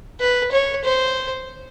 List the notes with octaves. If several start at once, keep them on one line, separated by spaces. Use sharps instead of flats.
B4
C#5
C5